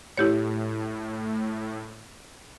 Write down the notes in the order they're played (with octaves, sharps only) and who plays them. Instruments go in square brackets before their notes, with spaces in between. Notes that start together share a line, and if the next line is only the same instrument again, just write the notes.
[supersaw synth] A2 [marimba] E4 G4 C#5